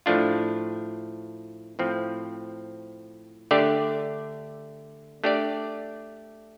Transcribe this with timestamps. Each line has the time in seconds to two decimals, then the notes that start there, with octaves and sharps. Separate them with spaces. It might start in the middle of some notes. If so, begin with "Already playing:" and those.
0.06 A2 F3 A3 D4 F4
1.79 A2 F3 C4
3.51 D3 A3 D4 G4 D5
5.24 A3 D4 G4 D5